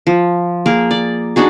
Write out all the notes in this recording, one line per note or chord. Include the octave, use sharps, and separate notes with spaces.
F3
A#3 G#4 A#4
D5
D4 D#4 F#4 G#4